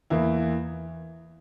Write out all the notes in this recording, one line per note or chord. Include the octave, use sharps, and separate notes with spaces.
E2 E3 A#3 E4